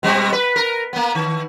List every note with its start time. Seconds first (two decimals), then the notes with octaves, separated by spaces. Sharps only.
0.03 B2 G3 C4
0.32 B4
0.56 A#4
0.93 A#3 B3
1.15 D#3